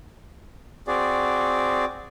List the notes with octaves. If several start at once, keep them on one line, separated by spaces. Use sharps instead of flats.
C4 F#4 G#4 D5